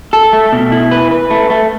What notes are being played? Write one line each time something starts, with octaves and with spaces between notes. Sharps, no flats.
A4
A3
B2
E4
B4
B4
A3
A3